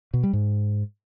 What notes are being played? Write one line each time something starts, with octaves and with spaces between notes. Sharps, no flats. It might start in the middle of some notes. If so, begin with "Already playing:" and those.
B2
G3
G#2